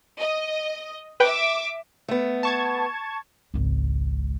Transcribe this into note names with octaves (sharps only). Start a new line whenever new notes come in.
D#5
B4 E5 G5 D6
A3 B3
A5 C#6 G#6
G#1 C#2